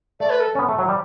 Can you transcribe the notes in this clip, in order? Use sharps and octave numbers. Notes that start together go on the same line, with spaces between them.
A3 D5
B4
A4
C#4
B3
A3
F#3
G3